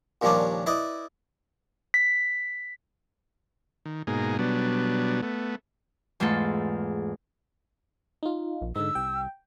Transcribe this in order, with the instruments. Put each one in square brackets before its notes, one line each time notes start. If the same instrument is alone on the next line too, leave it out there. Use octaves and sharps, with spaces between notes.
[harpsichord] D#2 A#2 F3 G3 C#4 D4
E4 B4 D5 D#5
[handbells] B6
[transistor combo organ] D#3
G#2 B2 A#3 D#4 G#4
B2 F#3 G3 B3 D4
A3 B3
[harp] E2 G#2 A3 F4 A4
[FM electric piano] D#4 F4
[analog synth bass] A#1
[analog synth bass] G#2 [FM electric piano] D3 D#4 [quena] E6
[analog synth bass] C2 [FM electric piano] G5